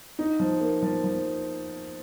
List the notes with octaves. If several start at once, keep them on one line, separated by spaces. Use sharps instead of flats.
D#4
F3
A#3
F3
F3